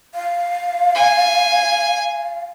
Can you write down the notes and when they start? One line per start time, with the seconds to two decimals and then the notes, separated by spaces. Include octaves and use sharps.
0.15 F5
0.95 G#5